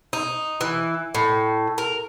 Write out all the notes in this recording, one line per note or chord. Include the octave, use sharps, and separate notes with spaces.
D#4
E3
A2
A#4